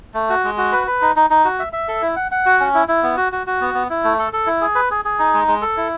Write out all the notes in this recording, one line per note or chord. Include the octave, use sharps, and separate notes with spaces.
A3
F#4
G#3
F#4
B4
B4
D#4
D#4
D#4
F#4
E5
E5
A4
E4
F#5
F#5
F#4
C#4
E4
E4
B3
F#4
F#4
F#4
B3
B3
E4
A3
A4
A4
E4
G#4
B4
G#4
G#4
D#4
G#3
G#3
A4
E4